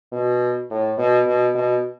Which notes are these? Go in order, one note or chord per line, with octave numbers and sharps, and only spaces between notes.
B2
A2
B2
B2
B2